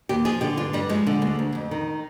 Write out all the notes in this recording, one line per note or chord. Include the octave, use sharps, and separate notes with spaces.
D#2 G4
F3 G#4
D3 G4
G2 F4
G2 G3
F3 G#3
D3
D2
D2
F2
D#3